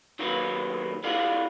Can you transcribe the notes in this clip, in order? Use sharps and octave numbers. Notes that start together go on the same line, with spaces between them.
D#3 F#3 A#3 C#4 F#4 B4
E4 F4 G#4 D5 F5 F#5